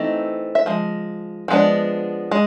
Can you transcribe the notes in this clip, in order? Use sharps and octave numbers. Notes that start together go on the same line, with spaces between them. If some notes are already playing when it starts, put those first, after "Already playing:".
Already playing: E3 A3 C4 D#4
E5
F3 G#3
F3 G#3 B3 D4
G#3